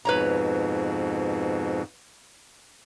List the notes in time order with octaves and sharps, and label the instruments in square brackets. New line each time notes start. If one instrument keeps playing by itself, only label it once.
[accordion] F2 G#2 B2 [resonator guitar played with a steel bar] B4 C#5 A#5